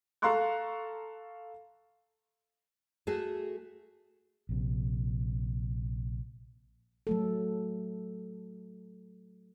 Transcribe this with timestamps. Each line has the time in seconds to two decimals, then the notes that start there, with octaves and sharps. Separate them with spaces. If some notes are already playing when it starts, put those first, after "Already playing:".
0.22 A4 F5 A#5 C6 C#6 F#6
3.07 A3 F#4 G#4 A4
4.49 A#1 C3
7.07 F#3 A3 A4